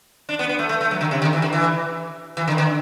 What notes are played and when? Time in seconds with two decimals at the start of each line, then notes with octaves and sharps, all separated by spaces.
0.29 D4
0.39 B3
0.49 B3
0.59 A3
0.69 A3
0.81 A3
0.91 F#3
1.01 D3
1.11 C3
1.22 D3
1.33 E3
1.42 D3
1.53 E3
2.37 E3
2.48 D3
2.58 D3